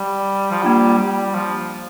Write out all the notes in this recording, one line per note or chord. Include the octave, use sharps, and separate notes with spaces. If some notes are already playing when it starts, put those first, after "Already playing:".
Already playing: G3
F3
G3 A#3 D4 F4
G3
F3